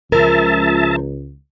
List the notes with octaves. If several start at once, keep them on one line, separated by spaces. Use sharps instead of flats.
C#2 F3 A#4 E5 A5